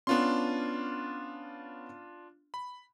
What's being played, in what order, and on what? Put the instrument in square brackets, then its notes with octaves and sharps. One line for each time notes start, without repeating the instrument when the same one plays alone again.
[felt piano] B3 C#4 [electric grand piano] D4 F4 C6
[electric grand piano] B5